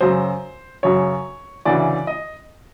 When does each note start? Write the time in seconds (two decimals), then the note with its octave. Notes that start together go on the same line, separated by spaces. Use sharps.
0.01 F#2 C#3 F#3 C5
0.83 F#2 C#3 F#3 C#5
1.65 D2 C#3 E3 D5
2.07 D#5